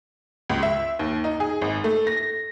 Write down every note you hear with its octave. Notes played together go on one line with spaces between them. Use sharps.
C#2
E5
D#2
D#4
G#4
G#1
A3
A#6